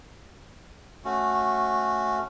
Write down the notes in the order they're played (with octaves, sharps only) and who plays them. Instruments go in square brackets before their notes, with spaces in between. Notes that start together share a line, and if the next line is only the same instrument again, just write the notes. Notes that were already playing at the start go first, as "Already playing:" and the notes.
[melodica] A3 C#4 F#4